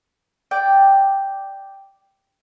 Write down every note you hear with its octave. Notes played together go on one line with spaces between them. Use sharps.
D5 G5